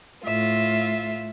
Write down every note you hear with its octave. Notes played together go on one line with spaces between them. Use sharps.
A2 F4 E5